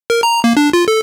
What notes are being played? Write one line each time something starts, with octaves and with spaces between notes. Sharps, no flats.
A#4
A#5
A#3
D4
F4
A4